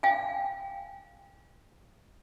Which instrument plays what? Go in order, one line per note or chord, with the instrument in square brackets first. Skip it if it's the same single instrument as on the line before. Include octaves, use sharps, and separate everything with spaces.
[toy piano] F5 G5 G#5